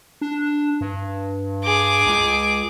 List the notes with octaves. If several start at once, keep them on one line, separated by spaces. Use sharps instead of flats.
D4
G2
G#4 D6
C#2